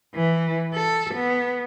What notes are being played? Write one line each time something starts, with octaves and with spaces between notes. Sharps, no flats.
E3
A4
B3